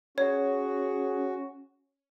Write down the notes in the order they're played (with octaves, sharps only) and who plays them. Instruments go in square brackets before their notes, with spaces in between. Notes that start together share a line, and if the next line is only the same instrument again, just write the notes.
[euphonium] C#4 [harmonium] F#4 [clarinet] G#4 [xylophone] C#5